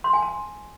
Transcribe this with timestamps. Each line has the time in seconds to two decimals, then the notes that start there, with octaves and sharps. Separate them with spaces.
0.04 C6
0.13 G#5
0.22 A5